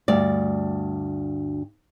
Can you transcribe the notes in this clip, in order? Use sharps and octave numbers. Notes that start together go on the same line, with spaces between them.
D2 G2 D5